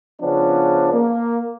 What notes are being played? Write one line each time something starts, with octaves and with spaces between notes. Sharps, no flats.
C#3 F3 B3 C#4 D4
A#3